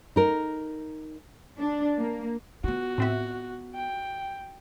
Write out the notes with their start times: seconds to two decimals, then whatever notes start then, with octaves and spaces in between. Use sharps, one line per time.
0.16 D#4 A#4
1.59 D4
1.97 A#3
2.64 B3 F4 F#4
2.98 A2 C4 E5
3.75 G5